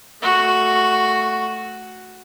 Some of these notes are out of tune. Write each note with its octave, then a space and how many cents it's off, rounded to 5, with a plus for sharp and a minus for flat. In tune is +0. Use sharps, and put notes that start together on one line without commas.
A3 +0 F#4 +0